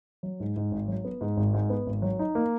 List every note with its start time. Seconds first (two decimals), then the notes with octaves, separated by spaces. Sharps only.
0.23 F#3
0.40 G#2
0.56 G#2
0.72 G#1
0.88 F#3
1.04 B3
1.21 G#2
1.37 G#1
1.54 G#2
1.70 B3
1.86 G#1
2.02 F#3
2.19 D#4
2.35 A#3